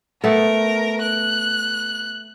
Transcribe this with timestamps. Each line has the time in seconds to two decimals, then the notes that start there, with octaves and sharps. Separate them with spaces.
0.24 A3 B3 A4 A#4
1.02 F#6